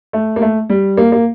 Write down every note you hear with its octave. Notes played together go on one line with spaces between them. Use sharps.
A3
A#3
A3
G3
A#3
A#3